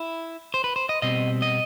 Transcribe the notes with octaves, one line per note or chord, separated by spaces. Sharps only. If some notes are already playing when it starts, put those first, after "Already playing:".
Already playing: E4
C5
B4
C5
D#5
B2 G3 C4 D#5
D#5